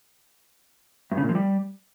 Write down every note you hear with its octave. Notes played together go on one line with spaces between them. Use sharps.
G2
C#3
A#2
F3
G3